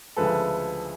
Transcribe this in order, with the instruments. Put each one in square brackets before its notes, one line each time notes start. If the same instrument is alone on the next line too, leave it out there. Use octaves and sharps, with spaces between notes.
[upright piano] D2 C#3 F3 G#3 A4 B4